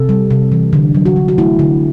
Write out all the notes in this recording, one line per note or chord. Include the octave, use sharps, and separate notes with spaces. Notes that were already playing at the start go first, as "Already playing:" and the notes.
Already playing: C3 A4
G3
C3
E3
D3
F#3
F#4
D3
F#4
A3 E4
D3